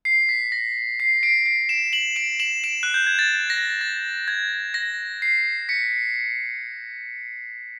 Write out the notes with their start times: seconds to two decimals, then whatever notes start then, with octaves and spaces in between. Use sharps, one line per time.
0.05 C7
0.29 B6
0.52 A#6
1.00 C7
1.23 C7 D7
1.46 C7 D7
1.69 D7 E7
1.93 E7 F#7
2.16 D7 E7
2.40 E7 F#7
2.64 D7 E7
2.83 F#6
2.94 G6
3.07 G#6
3.19 A6
3.50 A#6
3.81 A6
4.28 G#6
4.74 A#6
5.22 C7
5.69 B6 C#7